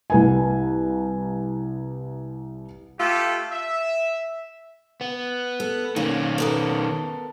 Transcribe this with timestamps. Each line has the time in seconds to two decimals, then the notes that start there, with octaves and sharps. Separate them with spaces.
0.10 C2 B4 G#5
2.99 A3 F4 G4 A4
3.51 E5
5.01 B3
5.60 A4
5.96 D#3 A#3 C#4
6.38 B3 A4 A#4